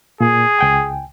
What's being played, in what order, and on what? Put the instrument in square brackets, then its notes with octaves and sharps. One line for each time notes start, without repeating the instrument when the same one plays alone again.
[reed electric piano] A#2 [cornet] G#4
[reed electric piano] C#2 G5 G#5